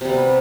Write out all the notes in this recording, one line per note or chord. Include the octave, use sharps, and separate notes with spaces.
C3 G3 B3